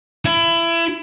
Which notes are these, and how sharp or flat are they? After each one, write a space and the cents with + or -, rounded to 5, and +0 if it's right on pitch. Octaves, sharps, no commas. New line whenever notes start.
E4 +25